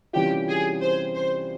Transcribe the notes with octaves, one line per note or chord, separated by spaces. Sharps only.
C3 E3 G3 C#4 F4 G4
G#4
C5
C5